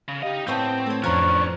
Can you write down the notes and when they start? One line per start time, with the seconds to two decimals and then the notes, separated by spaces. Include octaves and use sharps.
0.08 C#3
0.23 D#4 G4 D#5 F5
0.47 A2 B3 C4 C5 G5 A5 C#6 G6
0.86 A3 A4 C#5
1.04 F2 F3 C#4 D4 C#5 A#5 C#6 F#6